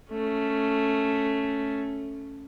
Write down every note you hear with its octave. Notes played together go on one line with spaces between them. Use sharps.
A3 C#4